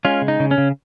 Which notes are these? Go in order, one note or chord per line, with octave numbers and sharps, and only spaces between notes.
G#3 C#4 F4
C#3
D#4
C#3
C#4
C#3